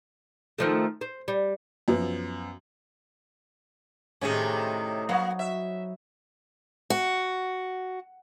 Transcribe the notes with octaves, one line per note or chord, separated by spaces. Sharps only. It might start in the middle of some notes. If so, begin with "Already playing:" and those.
D#3 F3 A3
C5
G3
F#2 F3 B3
A2 C3 D#3 C#4 G#4
F#3 A#3 F#4 F5
E5
F#4